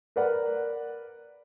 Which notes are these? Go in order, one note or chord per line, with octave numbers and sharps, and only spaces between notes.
A#4 B4 D5 F#5